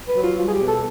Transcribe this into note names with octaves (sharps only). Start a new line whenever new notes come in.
B4
F#3
F4
G3 F4
G#4
G4
B2
A4